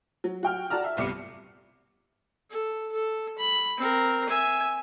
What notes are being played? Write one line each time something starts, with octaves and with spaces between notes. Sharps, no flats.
F#3
F#4 G5 F6
F#4 D5 A5 A#5 F6
E5
G1 C2 G3 D6 C#7
A4
A4
B5
C4 A#4
E5 G#5